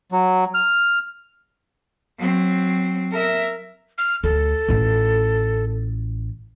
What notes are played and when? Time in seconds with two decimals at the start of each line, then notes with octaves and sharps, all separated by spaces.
0.12 F#3
0.54 F6
2.19 F#3 C4
3.12 A#4 E5
3.98 F6
4.24 D2 A4
4.69 A1 F4